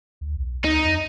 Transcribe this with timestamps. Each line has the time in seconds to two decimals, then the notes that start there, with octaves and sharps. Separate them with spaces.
0.21 D2
0.36 B1
0.64 D2 D#4
0.84 F2